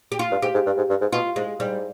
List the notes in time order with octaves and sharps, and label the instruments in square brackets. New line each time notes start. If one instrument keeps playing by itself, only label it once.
[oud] G4
F4
[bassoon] G2
[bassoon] G#2 [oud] G4
[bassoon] G#2
G2
G#2
G2
G#2
[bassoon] B2 [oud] F4
[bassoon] G#2 [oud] G#3
[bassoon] G#2 [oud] G3